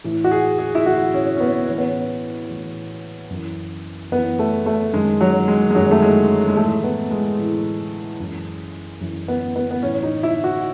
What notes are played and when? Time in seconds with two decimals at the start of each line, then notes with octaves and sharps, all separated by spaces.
0.04 A2 E3
0.24 F#4
0.31 G#4
0.58 G#4
0.75 E4
0.86 A2 E3 F#4
1.14 C#4
1.36 C#4
1.40 B3
1.67 A2 E3 C#4
1.78 B3
1.89 C#4
2.49 A2 E3
3.30 F#2 E3
4.12 F#2 E3 B3
4.39 A3
4.66 A3
4.94 F#2 D#3 G#3
5.21 F#3
5.48 G#3
5.71 G#3
5.75 F#2 D#3 F#3
5.91 A3
6.02 G#3
6.48 G#3
6.57 A2 E3 A3
6.84 B3
7.11 G#3
7.38 A2 E3
8.20 F#2 E3
9.01 F#2 E3
9.28 B3
9.56 B3
9.71 B3
9.82 A2 E3 C#4
10.03 D#4
10.23 E4
10.44 F#4